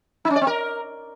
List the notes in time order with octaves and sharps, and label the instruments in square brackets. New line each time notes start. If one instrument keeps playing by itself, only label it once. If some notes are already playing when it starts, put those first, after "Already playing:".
[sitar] D#4
C#4
D5
C4
A#4